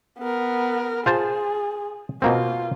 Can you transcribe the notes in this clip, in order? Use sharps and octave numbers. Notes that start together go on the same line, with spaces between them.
B3 A#4
F4 G#4 C5 A5
B2 A#3 C4 F4